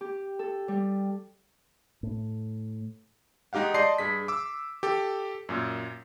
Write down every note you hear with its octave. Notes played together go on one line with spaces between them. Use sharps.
G4
A4
G3
A2
G#3 D#4 G4 F5 F#5
D5 D#5 A5 C6 G6 C7
G2 G#4 B6
D6 E6
G4 A4
F#2 A#2